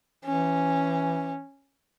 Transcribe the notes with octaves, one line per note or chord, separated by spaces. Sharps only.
E3 C#4